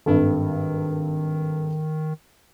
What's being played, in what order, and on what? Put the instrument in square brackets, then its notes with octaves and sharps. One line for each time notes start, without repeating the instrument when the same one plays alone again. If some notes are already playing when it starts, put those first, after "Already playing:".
[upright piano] G#1 G2 A4 [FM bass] D#3